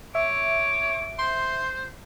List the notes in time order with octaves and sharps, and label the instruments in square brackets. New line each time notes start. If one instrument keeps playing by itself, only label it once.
[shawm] C#5 [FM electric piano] E5 [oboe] D6
[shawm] C5 [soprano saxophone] C6